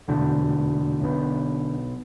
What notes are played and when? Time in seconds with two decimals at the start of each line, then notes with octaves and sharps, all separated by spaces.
0.08 F1 E2 B2 D3
1.00 B1 B2